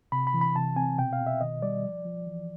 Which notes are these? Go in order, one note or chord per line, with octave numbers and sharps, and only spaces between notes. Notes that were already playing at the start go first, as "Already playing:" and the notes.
C3 B5
B5
E3
B5
C3 A5
C4 G#5
B2 G5
F5
B2
E5
D#3 D#5
G3 D5
F3
F3
E3